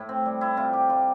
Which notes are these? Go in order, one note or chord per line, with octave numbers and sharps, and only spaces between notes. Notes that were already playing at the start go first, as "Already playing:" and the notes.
Already playing: A2 E4
C4
G3
E4
C3 F4
G4
G3 F4